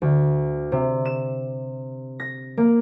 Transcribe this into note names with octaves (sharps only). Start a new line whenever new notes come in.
D2
C3
E7
A#6
A#3